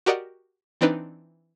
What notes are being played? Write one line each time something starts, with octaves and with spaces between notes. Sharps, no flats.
F#4 G4 A#4 D5 D#5 F#5
E3 C4 D4 D#4 B4